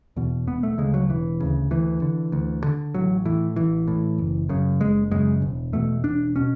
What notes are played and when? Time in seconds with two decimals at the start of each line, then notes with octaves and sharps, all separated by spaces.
0.16 E2 B2
0.47 E1 B3
0.63 A3
0.78 D2 C#3 G#3
0.94 F#3
1.09 E1 E3
1.40 D2 C#3
1.71 D2 E3
2.02 D3
2.32 D2
2.64 D3
2.94 A1 F#3
3.25 A2 E3
3.56 A1 E3
3.87 A2
4.18 F#1
4.49 F#2 C#3
4.80 F#1 G#3
5.11 F#2 C#3 G#3
5.42 E1
5.73 E2 B2 A3
6.04 E1 D4
6.36 B2 C#4